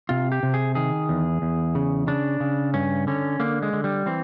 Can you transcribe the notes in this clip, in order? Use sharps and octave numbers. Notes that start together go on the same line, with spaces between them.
C3 F4
G4
C3
G#4
D#3 G#4
E2
E2
C#3
C#3 D4
C#3
G2 C#4
D3 C#4
D3 A#3
G#3
D3
G3
E3 C4